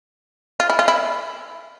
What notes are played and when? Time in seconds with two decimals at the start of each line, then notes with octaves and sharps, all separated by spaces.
0.60 F4
0.70 E4
0.79 F4
0.88 E4